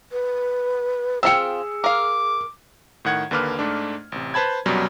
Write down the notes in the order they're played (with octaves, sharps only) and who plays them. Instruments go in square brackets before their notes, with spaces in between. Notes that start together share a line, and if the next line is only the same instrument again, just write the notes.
[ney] B4
[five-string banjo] C4 F4 G5 [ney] G#4 [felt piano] E6 C#7
[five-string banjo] A#4 F5 [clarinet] D6
[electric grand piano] A2 D#3 F#5 G#6
D#2 D3 A#3 B4 D6 F6
G#2 A3 D4
A1 C3
B4 C5 A5 B5 G#6
C2 F#2 B2 F#3 G3